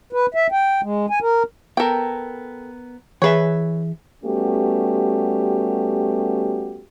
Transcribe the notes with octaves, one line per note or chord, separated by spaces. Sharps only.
B4
E5
G5
G#3
G#5
A#4
B3 A4 A#4 G5
E3 G#4 B4 C#5 E5
G3 A3 B3 C#4 F#4 G4